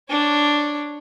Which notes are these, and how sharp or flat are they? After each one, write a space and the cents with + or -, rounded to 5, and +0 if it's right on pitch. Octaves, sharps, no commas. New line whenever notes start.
D4 +0 C#5 +0